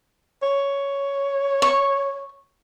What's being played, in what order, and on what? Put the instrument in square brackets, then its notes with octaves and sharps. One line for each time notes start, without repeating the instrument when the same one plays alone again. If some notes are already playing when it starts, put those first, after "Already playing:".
[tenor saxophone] C#5
[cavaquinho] C#6